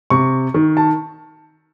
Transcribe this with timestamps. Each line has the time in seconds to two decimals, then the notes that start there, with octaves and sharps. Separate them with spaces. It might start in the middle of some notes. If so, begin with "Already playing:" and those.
0.10 C3 C#6
0.54 D#3
0.77 A5